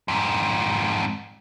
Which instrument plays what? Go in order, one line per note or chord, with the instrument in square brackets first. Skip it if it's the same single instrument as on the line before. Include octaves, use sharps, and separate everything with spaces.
[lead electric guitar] F2 G#2